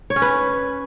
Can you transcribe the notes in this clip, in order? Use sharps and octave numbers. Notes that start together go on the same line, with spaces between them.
C#5
C#4
B4